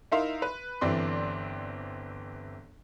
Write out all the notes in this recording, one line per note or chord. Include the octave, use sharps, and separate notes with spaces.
D#4 E4 A#4 E5 F5 C6
B4
G1 E3 C4 D5 C6